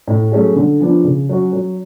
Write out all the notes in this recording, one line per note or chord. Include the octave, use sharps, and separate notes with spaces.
A2
F#3 A3 C#4 G#4
D3
F3 B3 D4
C#3
F#3 C#4 F#4
F#3